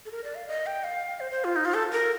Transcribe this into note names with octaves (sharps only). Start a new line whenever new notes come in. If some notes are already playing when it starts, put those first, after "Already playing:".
A4
A#4
D5
F5
D#5
G5
F5
C5
C5
F4
D#4
F4
A4
A#4